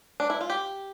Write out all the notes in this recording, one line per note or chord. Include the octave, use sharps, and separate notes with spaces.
D4
E4
F4
G4